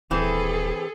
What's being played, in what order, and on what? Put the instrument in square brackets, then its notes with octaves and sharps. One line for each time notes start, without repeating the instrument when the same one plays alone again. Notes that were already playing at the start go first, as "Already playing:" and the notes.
[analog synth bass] D#1 [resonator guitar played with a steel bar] E3 C4 [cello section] G#4 A4